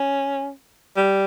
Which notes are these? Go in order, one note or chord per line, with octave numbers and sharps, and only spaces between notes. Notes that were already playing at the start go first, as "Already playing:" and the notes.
Already playing: C#4
G3